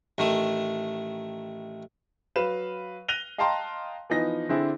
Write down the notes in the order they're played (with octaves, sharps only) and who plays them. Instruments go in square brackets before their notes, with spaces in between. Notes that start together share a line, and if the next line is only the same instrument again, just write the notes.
[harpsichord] A1 D#3 A3 D#6
[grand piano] F#3 B4 F5 E7
F#6 A#6 D#7 F7 G7
D#5 F5 G5 A5 A#5 C6
E3 F3 B3 D#4 A#6
D3 C4 D4 E4 G#4